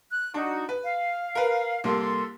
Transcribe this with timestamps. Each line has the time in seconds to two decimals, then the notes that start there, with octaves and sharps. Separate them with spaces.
0.11 F#6
0.34 D4 D#4 F#4
0.69 B4
0.83 F5
1.35 A#4 B4
1.84 C2 A#3 A4 C6